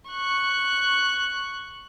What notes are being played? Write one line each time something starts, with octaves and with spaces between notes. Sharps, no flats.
C#6 F#6